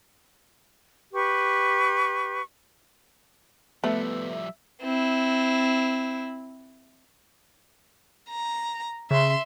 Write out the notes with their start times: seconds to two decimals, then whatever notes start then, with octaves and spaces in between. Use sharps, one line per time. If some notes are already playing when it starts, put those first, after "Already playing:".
1.13 G4 B4 C#6
3.84 F3 G3 A3 B3 E5
4.81 C4 E4
8.30 A#5
9.11 C#3 E5 C6